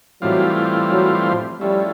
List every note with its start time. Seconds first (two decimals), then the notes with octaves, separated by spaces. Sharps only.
0.22 A2 E3 F#3 G3 C4 F4
0.92 F#3
1.26 F3
1.61 F3 G3 A3 C#4 E4